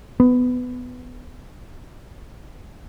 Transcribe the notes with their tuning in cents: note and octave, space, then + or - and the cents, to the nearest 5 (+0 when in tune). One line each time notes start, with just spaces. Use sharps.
B3 +15